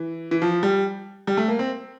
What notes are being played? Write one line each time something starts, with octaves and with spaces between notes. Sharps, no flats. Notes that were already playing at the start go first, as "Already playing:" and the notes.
Already playing: E3
E3
F3
G3
G3
A3
A#3
C4